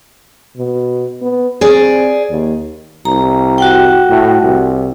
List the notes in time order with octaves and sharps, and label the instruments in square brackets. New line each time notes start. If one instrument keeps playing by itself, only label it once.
[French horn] B2
B3
[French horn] C4 [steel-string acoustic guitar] G#4 D5
[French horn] D#2
[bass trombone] C2 [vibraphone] A#5
[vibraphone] F#4 F#5 G5
[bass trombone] A2
C2